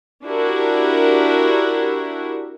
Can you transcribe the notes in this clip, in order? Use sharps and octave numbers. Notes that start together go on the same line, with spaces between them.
D4 E4 F#4 G4 A#4